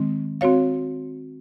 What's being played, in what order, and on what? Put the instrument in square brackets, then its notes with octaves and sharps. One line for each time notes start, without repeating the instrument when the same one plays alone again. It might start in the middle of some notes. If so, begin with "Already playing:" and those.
Already playing: [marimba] D#3 G#3 C4
C4 F#4 C#5 F5